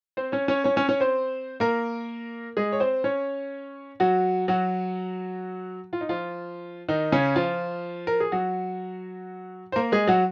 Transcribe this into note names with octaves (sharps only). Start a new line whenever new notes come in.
C4 C5
C#4 C#5
C#4 C#5
C#4 C#5
C#4 C#5
C#4 C#5
C4 C5
A#3 A#4
G#3 G#4
C#5
C4 C5
C#4 C#5
F#3 F#4
F#3 F#4
F4
D#4
F3 F4
D#3 D#4
C#3 C#4
F3 F4
A#4
G#4
F#3 F#4
C5
A#3 A#4
G#3 G#4
F#3 F#4